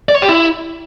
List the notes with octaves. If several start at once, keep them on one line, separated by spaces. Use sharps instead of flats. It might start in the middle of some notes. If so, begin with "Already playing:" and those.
D5
C#5
G4
E4